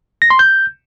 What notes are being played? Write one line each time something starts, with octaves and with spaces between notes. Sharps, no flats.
A#6
C6
G6